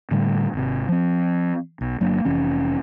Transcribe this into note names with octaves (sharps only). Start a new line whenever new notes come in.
A2 D3 G3
G#1 C3
F3 C4
B1
G1 F#3 A#3 D4
F1 E3 C#4